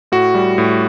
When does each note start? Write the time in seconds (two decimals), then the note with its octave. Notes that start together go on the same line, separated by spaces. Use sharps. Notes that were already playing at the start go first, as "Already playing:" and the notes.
0.12 A2 F#4
0.35 G3
0.58 A2